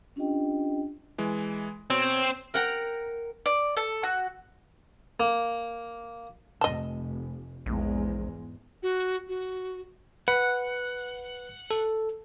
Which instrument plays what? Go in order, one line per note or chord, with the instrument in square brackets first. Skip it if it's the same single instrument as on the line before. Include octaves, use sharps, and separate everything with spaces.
[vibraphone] C#4 D4 F4 G4 D#5 G5
[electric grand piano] E3 G#3
[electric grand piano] B2 C#5 [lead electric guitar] C4
[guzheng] A#4 F#5 G5 A#5
[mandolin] D5
A4
F#4
[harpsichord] A#3
[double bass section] F1 [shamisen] D#5 A5
[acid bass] A#1 [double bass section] E2 G#2 G#3
[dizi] F#4
F#4
[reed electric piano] B4 [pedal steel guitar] F#5
[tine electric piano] A4